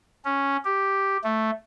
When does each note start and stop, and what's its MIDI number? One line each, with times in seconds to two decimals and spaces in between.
0.25 0.57 61
0.65 1.17 67
1.24 1.51 57